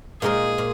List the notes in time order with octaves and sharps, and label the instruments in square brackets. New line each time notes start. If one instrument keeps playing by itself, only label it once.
[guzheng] A#2 G#3 D#4 A#4 [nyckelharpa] G#4
[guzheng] A#2